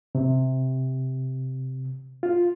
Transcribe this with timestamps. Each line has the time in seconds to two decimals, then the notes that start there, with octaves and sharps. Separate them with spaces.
0.15 C3
2.23 F4